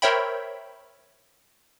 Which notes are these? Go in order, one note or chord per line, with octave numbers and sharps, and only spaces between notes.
A#4 C5 C#5 E5 G5 B5